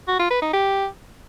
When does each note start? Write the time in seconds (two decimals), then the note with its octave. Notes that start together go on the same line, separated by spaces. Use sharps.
0.08 F#4
0.19 F4
0.31 B4
0.42 D#4
0.53 G4